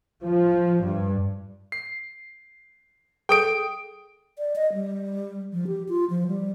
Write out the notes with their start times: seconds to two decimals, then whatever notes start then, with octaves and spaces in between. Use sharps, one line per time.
0.22 F3
0.83 G2
1.72 C7
3.29 G#4 A4 G5 D#6 D7
4.38 D5
4.56 D#5
4.74 G3
5.53 F3
5.67 G4
5.89 F4
6.10 F3
6.28 G3